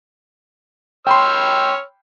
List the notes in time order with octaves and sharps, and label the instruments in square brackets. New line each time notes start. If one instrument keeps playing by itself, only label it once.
[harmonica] C#5 E6 F6 [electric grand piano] G5 B5 C6